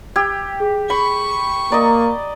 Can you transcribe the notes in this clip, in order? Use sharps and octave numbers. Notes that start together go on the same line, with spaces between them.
G4 E6 G#6
G#4
B5 C#6
A#3 D5 D#5 A#5